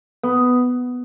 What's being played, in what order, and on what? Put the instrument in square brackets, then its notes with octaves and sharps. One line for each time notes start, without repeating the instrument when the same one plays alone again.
[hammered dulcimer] B3